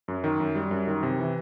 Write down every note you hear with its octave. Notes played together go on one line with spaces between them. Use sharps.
F#2
D#3
F#2
G3
F#2
D#3
C3
E3